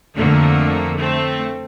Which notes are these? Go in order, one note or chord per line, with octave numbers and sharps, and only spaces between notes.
F2 D3 A3 A#3
A3 C4